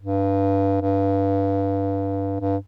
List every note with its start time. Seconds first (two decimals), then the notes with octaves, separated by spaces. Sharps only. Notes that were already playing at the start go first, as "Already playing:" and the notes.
0.01 G2
0.81 G2
2.40 G2